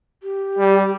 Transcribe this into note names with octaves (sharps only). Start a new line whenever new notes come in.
G4
G3